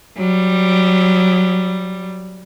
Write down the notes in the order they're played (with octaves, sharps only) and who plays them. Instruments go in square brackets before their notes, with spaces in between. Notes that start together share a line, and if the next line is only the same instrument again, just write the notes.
[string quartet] F#3 G3